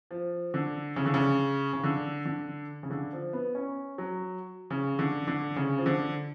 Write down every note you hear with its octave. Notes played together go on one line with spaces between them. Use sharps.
F3
D3
C#3
D3
C#3
C#3
D3
D3
C#3
D3
F3
B3
C#4
F#3
C#3
D3
D3
C#3
F3
D3